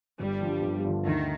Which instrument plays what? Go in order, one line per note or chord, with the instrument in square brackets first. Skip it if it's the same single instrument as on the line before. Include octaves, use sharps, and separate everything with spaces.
[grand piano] G1 [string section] G3
[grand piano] G2 D3 F3
G1
G2 D3 F3
[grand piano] D2 [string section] D#3